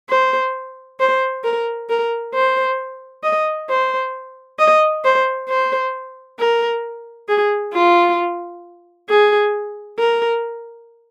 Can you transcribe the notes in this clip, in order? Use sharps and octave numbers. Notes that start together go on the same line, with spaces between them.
C5
C5
A#4
A#4
C5
D#5
C5
D#5
C5
C5
A#4
G#4
F4
G#4
A#4